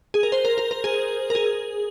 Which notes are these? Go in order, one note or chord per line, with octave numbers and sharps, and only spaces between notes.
G#4
A#4
C5
A#4
A#4
A#4
G#4
A#4
G#4